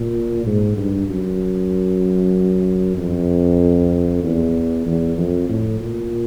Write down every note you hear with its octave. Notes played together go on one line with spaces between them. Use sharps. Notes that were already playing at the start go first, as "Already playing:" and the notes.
Already playing: A#2
G#2
G2
F#2
F2
E2
E2
F2
A2
A#2